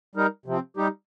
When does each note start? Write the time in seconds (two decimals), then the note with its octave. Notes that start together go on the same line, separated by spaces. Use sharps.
0.15 G3 D#4 A#4
0.46 C3 F3 C4
0.77 G3 D#4 G4